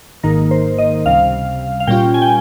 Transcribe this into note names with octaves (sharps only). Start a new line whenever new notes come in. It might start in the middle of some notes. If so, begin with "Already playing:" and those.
G#1 G#2 D#3 A#3 D#4 A#4
C5
D#5
C#2 C3 G3 F5
F5
A#2 G3 C#4 F4 G5
G#5
G5